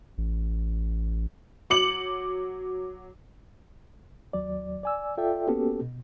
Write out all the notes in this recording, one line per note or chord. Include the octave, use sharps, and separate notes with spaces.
A1
F#3 D6 C#7 F#7
D#2 F#3 D5
D5 G#5 E6
F4 A4 D5 E5 G5
A#3 B3 C#4 F#4 G4 A4
B2